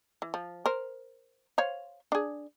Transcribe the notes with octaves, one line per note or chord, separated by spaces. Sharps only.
E3
F3
A#4 C5
C5 C#5 F5
D4 G#4